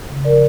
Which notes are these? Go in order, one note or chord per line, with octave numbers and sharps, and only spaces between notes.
C#3
F3 A#4 D5